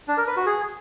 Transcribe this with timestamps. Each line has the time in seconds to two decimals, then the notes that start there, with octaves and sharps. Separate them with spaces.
0.08 D4
0.18 A#4
0.27 B4
0.37 F#4
0.46 G#4